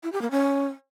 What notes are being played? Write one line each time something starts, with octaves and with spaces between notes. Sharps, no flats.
E4
G4
A#3
C#4